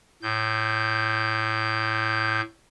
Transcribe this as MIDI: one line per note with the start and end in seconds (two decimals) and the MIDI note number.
0.22 2.41 45
0.22 2.41 91